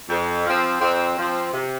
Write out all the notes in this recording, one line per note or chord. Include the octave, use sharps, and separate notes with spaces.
F2
F3 C4
F2 C4
F3 C4
C3